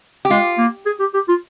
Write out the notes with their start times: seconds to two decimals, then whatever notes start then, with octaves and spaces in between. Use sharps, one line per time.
0.25 G4
0.30 G#3 F4
0.58 A#3
0.86 G#4
1.00 G4
1.14 G4
1.29 F4